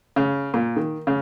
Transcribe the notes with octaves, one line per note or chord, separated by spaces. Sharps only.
C#3
A#2
D#3
C#3